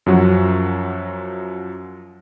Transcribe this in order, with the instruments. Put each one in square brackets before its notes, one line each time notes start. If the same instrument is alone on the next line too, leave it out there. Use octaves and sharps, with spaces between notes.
[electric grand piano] F#2 F3 F#3 F#4